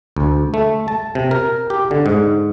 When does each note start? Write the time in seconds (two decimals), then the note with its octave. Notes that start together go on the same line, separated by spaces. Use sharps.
0.17 D2
0.54 A3
0.88 A5
1.15 C3
1.31 A#4
1.70 G4
1.91 D3
2.06 G#2